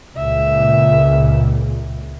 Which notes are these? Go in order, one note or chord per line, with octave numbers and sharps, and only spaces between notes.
C#2 A#2 E5